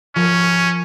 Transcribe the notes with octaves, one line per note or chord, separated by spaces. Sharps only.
F3 C#4 A#4 C#6